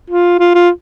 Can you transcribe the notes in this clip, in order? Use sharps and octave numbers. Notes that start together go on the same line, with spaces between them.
F4
F4
F4